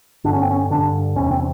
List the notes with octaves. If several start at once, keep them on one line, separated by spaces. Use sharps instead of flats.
G2 D3 D4
C#4
C4
C#4
G2 D3 D4
E2 C3 C#4
C#4
C4